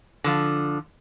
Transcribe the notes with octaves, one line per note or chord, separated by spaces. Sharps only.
D3 F3